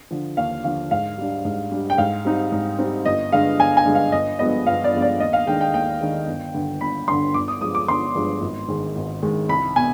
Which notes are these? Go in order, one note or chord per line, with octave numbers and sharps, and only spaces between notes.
D3 F3
D#2 F5
D3 F3 F5
G#2 F5
G3 D4
G#2
G3 D4
G5
G#2 F5
G3 C4 D#4
G#2
G3 C4 D#4
G1 D#5
G2 D3 G#3 F5
G1 G#5
G#5
G2 D3 G#3
F5
G1 D#5
G2 F3 G#3 B3 D#5
G1 F5
D5
G2 F3 G#3 B3
D5
D#2 D#5
F5
D#3 G#3 D4 G5
G5
D#2 G5
D#3 G#3 D4
G1
G2 D3
G1 B5
G2 D3 C6
G1 D6
D#6
G2 F3 G#3 D#6
D6
G1 C6
G2 F3 G#3
G#1
G#2 D#3 G#3
G#1
G#2 D#3 G#3
C2 B5
B2 B3 G#5